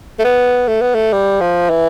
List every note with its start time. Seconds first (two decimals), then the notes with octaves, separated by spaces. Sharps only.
0.19 A3
0.24 B3
0.68 A3
0.81 B3
0.95 A3
1.12 G3
1.41 F3
1.70 E3